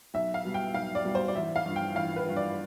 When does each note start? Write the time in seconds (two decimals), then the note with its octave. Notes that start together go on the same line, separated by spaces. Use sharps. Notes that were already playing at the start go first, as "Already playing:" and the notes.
0.14 B1 E5
0.34 F5
0.45 B2 G3
0.54 G5
0.74 B1 F5
0.95 D5
1.05 B2 G3
1.15 C5
1.28 D5
1.35 A1 E5
1.56 F5
1.66 G2 F3
1.76 G5
1.95 A1 F5
2.16 B4
2.26 G2 F3
2.36 D5